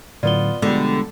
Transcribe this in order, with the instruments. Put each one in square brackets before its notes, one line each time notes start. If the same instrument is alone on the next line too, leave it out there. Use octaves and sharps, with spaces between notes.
[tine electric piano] A2 D3 F#3 [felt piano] B3 F4 [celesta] D5 G7
[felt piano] B2 F3 G3 [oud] D3 [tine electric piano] G#3 B3